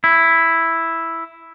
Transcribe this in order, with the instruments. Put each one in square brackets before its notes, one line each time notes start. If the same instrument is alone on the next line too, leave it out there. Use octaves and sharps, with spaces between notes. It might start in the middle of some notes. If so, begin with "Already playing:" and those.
[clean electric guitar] E4